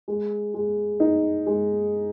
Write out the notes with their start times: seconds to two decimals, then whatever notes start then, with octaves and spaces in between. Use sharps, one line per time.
0.08 G#3
0.54 G#3
1.00 D#4
1.47 G#3